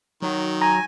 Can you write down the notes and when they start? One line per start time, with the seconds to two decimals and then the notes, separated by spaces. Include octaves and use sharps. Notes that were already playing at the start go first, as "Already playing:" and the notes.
0.22 D#3 F#3
0.62 G#5 A#5